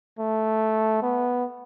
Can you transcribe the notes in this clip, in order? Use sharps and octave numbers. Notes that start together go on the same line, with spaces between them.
A3
B3